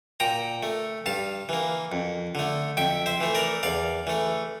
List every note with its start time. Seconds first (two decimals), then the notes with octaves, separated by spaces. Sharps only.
0.20 A#2 G5 A#5
0.63 A3
1.06 G2 F5 A5
1.49 E3 A#3
1.92 F2
2.35 D3 A3
2.77 F2 E5 G5
3.06 C5 E5
3.20 E3 A3
3.35 A#4 D5
3.63 E2 D5 F5
4.07 E3 A3